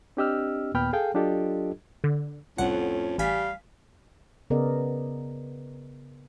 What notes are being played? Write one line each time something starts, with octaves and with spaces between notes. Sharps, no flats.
C4 D4 G4 D#5 E6 F6
D#2 A#2 B3 G5 B5 F6
G#4 A4 F5 G5
F#3 D4 F4 G4 A4 D#5
D3
C2 F2 A2 C#4 F#5
A1 G3 F5 G#5 B6
C#3 B3 G#4 A#4 D5 D#5